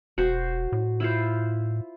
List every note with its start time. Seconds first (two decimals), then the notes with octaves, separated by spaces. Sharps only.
0.18 E1 F#4 C5
0.72 A2
1.00 E4 F4 C5